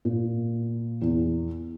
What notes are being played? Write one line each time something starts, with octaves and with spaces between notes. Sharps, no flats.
A#2
E2